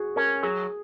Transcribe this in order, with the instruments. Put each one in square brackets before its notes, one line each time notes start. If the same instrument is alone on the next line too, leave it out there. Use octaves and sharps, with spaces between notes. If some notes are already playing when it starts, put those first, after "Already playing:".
Already playing: [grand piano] F#4 G#4
[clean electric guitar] C#4 [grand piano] A#4
[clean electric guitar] F#3 [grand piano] G#4